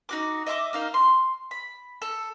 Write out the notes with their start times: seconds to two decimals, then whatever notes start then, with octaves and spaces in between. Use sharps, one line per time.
0.09 D#4 F#4 D6
0.46 D#5 E5 C6 D6
0.73 A#3 D#4 F5
0.94 C6
1.51 B5
2.02 A4